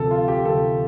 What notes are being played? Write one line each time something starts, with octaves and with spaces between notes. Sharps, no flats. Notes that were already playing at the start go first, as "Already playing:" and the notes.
Already playing: D2 C3 F3 A4
F4
G4
D2 C3 F3 A4